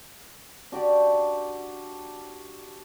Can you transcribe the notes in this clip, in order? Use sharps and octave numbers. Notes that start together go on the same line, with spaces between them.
D4 F#4 G4 D5